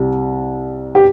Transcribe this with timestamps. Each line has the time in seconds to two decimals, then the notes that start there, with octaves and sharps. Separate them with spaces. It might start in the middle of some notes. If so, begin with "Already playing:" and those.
Already playing: C2 C3 G3
0.95 G4